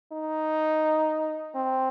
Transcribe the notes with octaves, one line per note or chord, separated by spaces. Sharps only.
D#4
C4